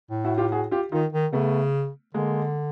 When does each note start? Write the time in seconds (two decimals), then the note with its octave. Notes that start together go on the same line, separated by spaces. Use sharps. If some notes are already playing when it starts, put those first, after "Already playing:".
0.10 A2
0.24 E4 F#4
0.38 F4 G4
0.52 F#4 G#4
0.71 F4 G4
0.92 D#3 D#4 F4
1.13 D#3
1.33 C#3 A3 B3
2.14 D3 G#3 A#3